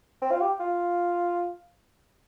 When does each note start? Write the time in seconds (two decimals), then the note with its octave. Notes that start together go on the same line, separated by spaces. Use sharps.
0.22 C4
0.31 F4
0.41 G4
0.60 F4